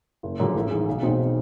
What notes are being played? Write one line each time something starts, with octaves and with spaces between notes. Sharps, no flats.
F#1
F#2 D3 F3 G#3
A1
G#2 E3 G#3
B1
B2 G#3 C4 D#4